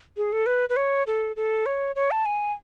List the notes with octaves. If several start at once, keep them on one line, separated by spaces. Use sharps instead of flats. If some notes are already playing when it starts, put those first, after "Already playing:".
G#4
A4
B4
B4
C#5
A4
A4
C#5
C#5
A5
G#5